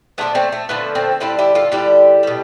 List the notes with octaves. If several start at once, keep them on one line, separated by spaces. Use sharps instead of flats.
D3 F3 A3 B3 D4
A3 C4
A3
D3 F3 A3 B3
A3 C4
D3 G3 C4 E4
E4 G4
F4 A4
D3 G3 E4 G4
B2 G3